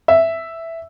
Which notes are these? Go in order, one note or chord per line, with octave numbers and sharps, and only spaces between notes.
E5